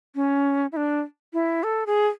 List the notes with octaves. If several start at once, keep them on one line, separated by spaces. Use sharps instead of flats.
C#4
E4
D4
E4
A4
G#4